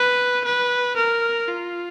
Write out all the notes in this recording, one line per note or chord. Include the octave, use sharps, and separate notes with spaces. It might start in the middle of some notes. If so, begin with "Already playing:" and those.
Already playing: B4
B4
A#4
F4